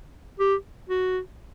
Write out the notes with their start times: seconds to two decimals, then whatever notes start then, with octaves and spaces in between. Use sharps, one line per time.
0.40 G4
0.89 F#4